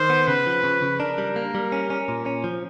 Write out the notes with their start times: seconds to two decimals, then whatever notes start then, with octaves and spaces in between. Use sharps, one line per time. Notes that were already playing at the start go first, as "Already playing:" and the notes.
Already playing: D#3 C5
0.10 B3
0.27 C#3 B4
0.46 F3
0.64 C#3
0.82 C#3
1.00 D4 A#4
1.18 G3
1.36 A#3
1.55 G3
1.72 C#4
1.90 C#4
2.08 A#2
2.26 C#4
2.44 F3